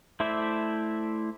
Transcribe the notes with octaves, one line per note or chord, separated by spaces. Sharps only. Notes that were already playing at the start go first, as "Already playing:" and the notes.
A3 E4 C5 D5 E5